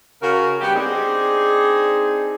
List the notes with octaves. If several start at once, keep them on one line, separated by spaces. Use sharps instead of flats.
C#3 F#4 A#4
B3 D4 G4
C4 D4 D#4 G#4